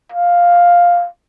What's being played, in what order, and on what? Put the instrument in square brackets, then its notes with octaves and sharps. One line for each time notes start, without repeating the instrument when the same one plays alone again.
[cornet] F5